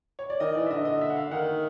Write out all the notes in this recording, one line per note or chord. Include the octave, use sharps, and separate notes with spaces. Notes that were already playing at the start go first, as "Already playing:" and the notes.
C#5
D5
D#3 D#5
E3 D5
E5
D3 D#5
D#5
E5
F#5
F5
D#3 F#5